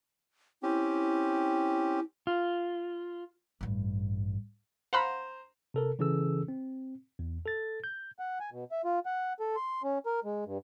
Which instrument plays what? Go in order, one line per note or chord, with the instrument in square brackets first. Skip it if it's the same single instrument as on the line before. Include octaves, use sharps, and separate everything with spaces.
[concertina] C4 C#4 G4 [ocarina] E4
[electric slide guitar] F4
[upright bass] A1 G2
[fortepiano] C5 A#5 [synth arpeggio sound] F5 F#5 B5
[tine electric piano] C3 A4 A#4
C#3 E3 C#4 G#4 A4 E6
C4
E2
A4 A6
G6
[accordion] F#5
G#5
B2
E5
F4
F#5
A4
C6
C#4
A#4
G#3
G2